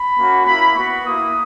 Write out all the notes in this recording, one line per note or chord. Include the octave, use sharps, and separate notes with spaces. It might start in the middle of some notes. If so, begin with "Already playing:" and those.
Already playing: B5
A#3 C#4 F#4
A#3 E4 B5
B3 F#4 C#6
A#3 E4 D#6